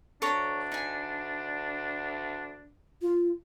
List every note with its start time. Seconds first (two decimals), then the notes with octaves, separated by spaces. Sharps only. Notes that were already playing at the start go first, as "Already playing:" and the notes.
0.22 D2 D4 A4 C#5 A#5
0.72 D#4 G#5
3.02 F4